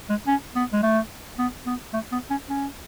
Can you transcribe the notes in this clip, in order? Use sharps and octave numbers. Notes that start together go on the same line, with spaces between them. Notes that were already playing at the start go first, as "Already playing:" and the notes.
G#3
C#4
B3
G#3
A3
B3
B3
A3
B3
C#4
C#4